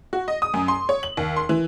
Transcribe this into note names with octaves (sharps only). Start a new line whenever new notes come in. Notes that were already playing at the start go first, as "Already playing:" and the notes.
F#4
D#5
D#6
F#2
C6
C#5
F#7
D#2
C6
E3